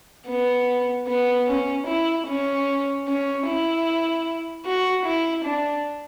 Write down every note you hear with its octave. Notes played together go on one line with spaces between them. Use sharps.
B3
B3
C#4
E4
C#4
C#4
E4
F#4
E4
D4